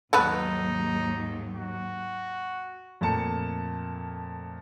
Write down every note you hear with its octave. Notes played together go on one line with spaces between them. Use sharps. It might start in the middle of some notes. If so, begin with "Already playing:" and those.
D#2 G#2 F#3 A3 B3 D#4 B4
F#4
F2 A#2 A3 A5 C#7